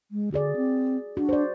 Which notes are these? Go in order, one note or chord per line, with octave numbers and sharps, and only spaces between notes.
G#3
D3 F#4 G#4 D5
C4
D4 F#4
C5 D5